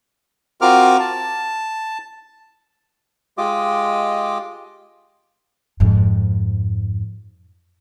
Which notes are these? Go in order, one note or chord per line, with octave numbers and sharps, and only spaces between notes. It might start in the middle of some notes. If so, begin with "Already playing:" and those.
C4 F4 F#4 A#4 D6 F6
A5
G#3 F4 G4 D#5 D6
F2 G#2